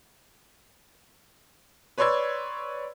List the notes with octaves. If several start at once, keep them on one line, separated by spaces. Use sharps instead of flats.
B4 C#5 D5 C6 E6 G#6